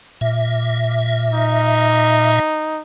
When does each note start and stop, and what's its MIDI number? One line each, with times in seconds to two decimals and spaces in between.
0.21 2.40 46
0.21 2.40 76
1.33 2.81 63